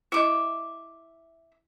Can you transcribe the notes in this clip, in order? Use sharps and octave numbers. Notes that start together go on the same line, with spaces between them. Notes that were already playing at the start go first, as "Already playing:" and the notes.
E4 D#5 E5 D6